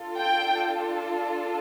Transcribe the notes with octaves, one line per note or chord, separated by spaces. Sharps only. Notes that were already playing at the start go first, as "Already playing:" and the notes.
Already playing: D4 F4 A4
G5